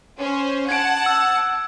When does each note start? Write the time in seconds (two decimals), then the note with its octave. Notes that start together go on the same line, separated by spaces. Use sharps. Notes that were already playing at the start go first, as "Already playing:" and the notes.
0.18 C#4 C5
0.69 F#5 A5 G#6 D7
1.06 E6